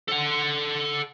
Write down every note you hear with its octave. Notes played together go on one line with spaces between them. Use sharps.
A4 F#5